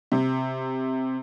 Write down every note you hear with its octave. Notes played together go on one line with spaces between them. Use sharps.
C3